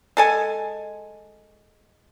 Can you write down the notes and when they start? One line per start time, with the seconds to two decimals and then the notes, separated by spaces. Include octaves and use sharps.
0.17 G#3 A4 G#5